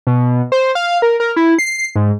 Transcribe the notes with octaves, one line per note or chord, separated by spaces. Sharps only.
B2
C5
F5
A#4
A#4
E4
C7
G#2